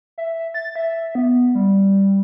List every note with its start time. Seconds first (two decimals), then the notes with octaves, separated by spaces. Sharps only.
0.18 E5
0.54 A6
0.76 E5
1.15 B3
1.55 G3